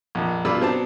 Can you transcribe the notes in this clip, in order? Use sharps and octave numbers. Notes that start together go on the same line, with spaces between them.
A#1 F2
G2 B2 F4 D5 B5 E6
B2 F#3 C4 D4 A5